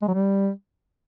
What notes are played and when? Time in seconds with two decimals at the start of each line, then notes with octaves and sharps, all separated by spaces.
0.02 G#3
0.08 F#3
0.14 G3